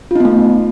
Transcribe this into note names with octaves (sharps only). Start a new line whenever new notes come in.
A3 B3 D#4 F4